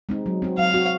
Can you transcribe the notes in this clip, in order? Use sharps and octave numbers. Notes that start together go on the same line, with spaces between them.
G#3 C4 D#4
F#3
C4 F#4
F#3 F5
C4 F#4